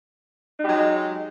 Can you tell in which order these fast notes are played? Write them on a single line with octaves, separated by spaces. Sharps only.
D#4 G#3 G4 F#3